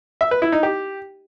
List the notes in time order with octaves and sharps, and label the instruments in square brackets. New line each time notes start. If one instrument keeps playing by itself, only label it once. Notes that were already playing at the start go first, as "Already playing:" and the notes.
[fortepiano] E5
B4
E4
D#4
G4